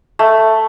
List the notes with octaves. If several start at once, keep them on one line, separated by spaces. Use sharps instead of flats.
A3